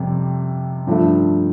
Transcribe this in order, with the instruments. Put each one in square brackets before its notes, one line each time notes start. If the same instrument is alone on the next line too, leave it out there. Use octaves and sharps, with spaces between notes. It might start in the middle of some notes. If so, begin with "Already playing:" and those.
Already playing: [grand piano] F2 C3 G3
G2 F3 A3